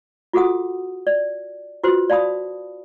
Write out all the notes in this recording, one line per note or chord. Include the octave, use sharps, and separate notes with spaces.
F4 F#4 G#4 A4 F#5 D#6
D5
F4 F#4 B4 C5
D5 F5 A5 B5 D#6